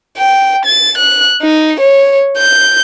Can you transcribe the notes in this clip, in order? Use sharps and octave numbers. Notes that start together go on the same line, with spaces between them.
G5
A6
F#6
D#4
C#5
G6